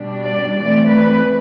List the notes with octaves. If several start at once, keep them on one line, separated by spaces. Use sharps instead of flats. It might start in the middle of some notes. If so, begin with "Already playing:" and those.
Already playing: B2 G3 D4
D5
E3 A3 C4 D5
B4